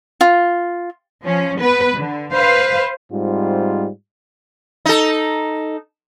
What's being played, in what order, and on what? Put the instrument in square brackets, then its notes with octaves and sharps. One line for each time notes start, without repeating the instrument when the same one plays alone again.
[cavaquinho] F4
[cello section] F3 C#4
B3 B4
D3
B4 C5 F5
[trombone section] G#2 G3 C4 F4
[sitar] D#4 A4